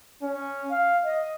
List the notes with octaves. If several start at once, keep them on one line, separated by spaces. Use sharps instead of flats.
C#4
F5
D#5